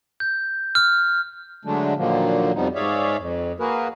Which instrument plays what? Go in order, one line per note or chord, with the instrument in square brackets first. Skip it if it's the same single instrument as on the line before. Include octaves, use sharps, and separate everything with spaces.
[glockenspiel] G6
F6
[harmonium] D3 F#3 G#3 A3 D4
A#2 D3 D#3 F3 F#3 A#3
F2 C3 F3 G3 B3 D#4
G#2 G#4 C#5 D5 E5 F5
F2
A#3 F#4 G#4 A#4 B4